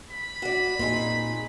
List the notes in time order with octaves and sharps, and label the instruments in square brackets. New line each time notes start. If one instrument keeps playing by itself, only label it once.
[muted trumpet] B5
[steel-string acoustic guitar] F#4 D5
[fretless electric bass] A#2 [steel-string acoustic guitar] C4 D#4 G#4